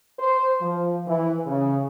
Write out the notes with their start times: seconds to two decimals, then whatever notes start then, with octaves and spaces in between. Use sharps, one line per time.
0.19 C5
0.61 F3
1.07 E3
1.46 C#3